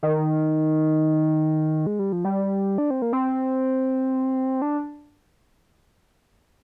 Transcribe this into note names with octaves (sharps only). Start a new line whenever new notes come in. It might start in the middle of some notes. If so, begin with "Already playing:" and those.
D#3
G#3
G3
F3
G3
D4
C4
A#3
C4
D4